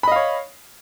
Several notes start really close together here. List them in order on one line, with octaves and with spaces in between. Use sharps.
B5 D#5 F5 C#5